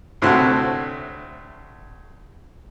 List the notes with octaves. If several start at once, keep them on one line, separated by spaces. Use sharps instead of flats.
D2 A2 C3 A3 F#4 F#6